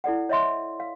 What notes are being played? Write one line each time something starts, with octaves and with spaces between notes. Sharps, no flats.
E4 A4 D5 F#5
C#5 D#5 E5 C6
F5